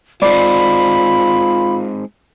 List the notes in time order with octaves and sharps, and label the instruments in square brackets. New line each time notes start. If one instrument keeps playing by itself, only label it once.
[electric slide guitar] G#3 C4 D#4 [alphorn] F4 [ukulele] D5 [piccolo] B5